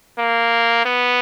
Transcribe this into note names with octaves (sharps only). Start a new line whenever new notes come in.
A#3
B3